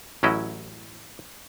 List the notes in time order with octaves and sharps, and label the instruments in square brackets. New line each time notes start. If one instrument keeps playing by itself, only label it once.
[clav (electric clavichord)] A1 F#3 C#4 E4 D#5